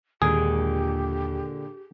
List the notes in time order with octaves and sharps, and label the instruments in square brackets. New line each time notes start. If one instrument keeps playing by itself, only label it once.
[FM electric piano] D#2 [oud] A#2 D3 G#3 [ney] G4 [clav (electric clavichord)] G#4